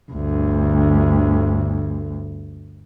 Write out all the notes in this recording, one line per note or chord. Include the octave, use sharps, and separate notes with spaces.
G1 D2